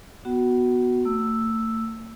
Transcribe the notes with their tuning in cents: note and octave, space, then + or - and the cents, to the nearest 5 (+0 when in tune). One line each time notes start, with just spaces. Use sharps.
B3 -5 F#4 +0 F#5 +35
A3 +40 E6 +0